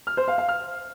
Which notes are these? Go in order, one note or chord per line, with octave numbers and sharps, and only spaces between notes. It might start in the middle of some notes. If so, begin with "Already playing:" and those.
F6
C5
F5
F5
F6